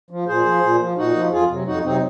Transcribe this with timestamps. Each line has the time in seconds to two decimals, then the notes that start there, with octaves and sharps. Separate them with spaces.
0.11 F3
0.27 A#2 G#4 C5
0.46 F3
0.63 A#2
0.80 F3
0.97 A#2 D#4 F#4
1.15 F3
1.32 F2 F4 G#4
1.49 C3 F#3
1.67 F2 D#4 F#4
1.84 C3 F#3 C4 D#4